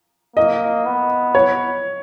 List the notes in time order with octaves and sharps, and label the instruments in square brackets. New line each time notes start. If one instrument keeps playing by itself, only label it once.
[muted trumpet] A#3 [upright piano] D#5
[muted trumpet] B3
[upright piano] C#5